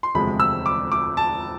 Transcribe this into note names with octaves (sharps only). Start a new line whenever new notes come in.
C6
E1 D2 C3 F3 G#3 B5
E6
D6
D6
A5